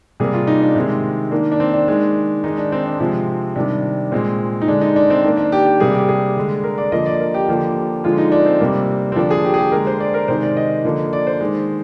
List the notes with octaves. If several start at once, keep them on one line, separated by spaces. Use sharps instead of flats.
C3 G3 A#3 G#4
F4
D#4
D4
C3 D#3 G#3 C4
D#3 A#3 D4
D4
C4
D4
D#3 G#3
D#3 G#3 D#4
D4
C4
D4
C3 F3 G#3 C4
C3 D#3 G3 D4
A#2 G#3 C4
D#4
D3 G#3 D4
D#4
D4
C4
D#3 A#3 D4
D4
G4
G4
C3 G3 A#3 G#4
G4
G#4
D3 G#3
A#4
D5
D3 F3 A#3 D#5
D5
A#4
G4
D3 F3 A#3 G4
D3 F3 G#3 F4
D#4
D4
C4
C3 G3 A#3
C4
D3 F3 A#3 D4
G#4
G4
G#4
G4
D3 G#3 A#4
C5
D5
A#4
C3 D#3 G#3 C5
D5
D#5
D3 F3 A#3
D5
C5
D#3 G#3